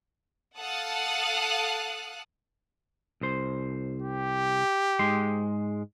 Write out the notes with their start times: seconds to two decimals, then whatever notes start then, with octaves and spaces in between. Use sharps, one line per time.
0.57 A4 F5 F#5 A5 D#6 F#6
3.21 C2 C5
4.02 G4
4.99 G#2 G#3 C6